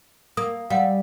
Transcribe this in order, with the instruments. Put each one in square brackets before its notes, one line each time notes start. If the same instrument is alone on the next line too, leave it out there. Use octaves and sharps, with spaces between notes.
[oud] A#3 [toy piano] D#6
[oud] G3 [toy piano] F5 F#5